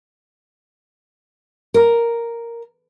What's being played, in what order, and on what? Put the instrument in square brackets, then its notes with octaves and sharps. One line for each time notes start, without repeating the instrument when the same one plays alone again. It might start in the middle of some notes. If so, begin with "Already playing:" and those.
[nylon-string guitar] A#4